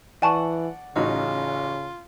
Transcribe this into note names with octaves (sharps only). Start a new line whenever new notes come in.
E3 D5 F#5 G#5 A5 C#6
A1 C#3 D#4 F4 F#4